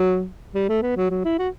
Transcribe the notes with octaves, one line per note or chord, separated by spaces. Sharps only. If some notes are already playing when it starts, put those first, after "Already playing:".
Already playing: F#3
G3
A3
B3
F#3
F#3
E4
F#4